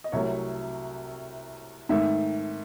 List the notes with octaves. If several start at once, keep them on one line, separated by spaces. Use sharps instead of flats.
D#5
C2 C3 F#3 A3 C#5
G#2 D#3 A3 E5